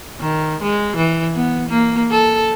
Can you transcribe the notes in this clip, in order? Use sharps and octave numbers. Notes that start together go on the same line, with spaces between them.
D#3
G#3
E3
B3
A#3
A4